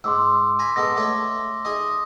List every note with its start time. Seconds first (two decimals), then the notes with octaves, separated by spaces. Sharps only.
0.04 G#2 C6 D6 E6
0.59 G#5 A#5 B5
0.76 G#3 B3 A4 A#6
0.97 A3 A4 C#5 D6
1.65 D#4 G#4 D#5